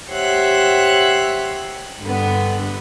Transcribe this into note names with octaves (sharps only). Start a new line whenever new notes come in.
G4 C5 C#5 E5 F#5 F#6
G2 D3 B3